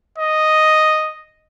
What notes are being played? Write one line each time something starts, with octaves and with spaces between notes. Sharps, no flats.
D#5